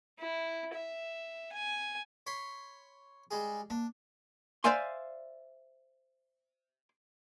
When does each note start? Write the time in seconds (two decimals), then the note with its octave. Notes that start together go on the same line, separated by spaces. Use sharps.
0.19 E4
0.75 E5
1.52 G#5
2.27 C#5 B5 C6
3.31 G3 G#3 G#4
3.70 A#3 D4
4.64 C5 D5 E5 F5 G#5 C6